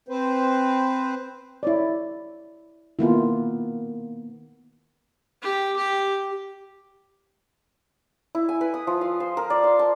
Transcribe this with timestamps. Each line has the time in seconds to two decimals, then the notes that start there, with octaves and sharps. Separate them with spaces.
0.08 C4 B4 C5
1.63 E4 C#5 D5
2.99 D#3 A#3 B3 E4 F4
5.42 G4
5.77 G4
8.35 E4
8.49 G#5
8.61 B4
8.74 D#6
8.87 F3
9.01 F5
9.20 C5
9.37 A#4
9.50 D5
9.64 C6
9.79 A5